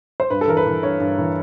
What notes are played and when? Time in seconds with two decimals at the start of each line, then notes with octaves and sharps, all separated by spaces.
0.20 C5
0.30 G2 B4
0.41 A4
0.48 E3 A#4
0.57 B4
0.66 E3
0.83 G2 C#5
1.00 G2
1.18 E3